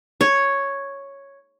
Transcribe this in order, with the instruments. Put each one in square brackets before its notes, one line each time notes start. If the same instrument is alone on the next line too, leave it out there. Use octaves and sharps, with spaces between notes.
[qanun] C#5